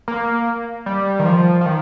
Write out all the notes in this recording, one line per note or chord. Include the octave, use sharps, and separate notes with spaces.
A#3
G3
D#3
F3
F3
D#3